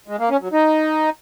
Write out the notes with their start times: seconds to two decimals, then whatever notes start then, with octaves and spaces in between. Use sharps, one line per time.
0.08 G#3
0.19 A#3
0.30 C#4
0.41 F#3
0.52 D#4